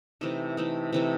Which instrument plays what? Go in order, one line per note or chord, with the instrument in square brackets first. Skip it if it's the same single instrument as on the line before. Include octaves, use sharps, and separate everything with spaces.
[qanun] C3 E3 A3 D#4
C3 E3 A3 D#4
C3 E3 A3 D#4